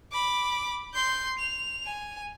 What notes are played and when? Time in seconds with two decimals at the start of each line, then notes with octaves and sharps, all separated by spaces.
0.12 B5 D6
0.94 C6 G6
1.39 F7
1.86 G#5